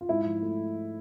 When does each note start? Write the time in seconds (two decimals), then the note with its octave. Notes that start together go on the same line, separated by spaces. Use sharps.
0.01 F4
0.09 G#2 E4
0.26 F3
0.42 A3